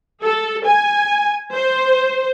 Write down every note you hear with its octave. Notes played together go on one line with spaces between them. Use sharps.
A4
G#5
C5